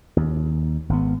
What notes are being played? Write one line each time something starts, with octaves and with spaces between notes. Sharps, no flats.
D#2
G#1 B3